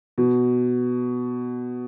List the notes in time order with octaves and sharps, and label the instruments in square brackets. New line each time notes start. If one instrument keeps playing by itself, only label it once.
[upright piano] B2